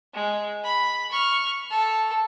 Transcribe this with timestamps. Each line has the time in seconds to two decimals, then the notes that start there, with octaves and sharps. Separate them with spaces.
0.14 G#3
0.64 B5
1.11 C#6 F6
1.70 A4